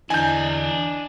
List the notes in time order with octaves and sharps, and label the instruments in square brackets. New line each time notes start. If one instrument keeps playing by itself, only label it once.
[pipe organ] E2 D3 E3 [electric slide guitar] D4 D#5 [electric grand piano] G#5 G6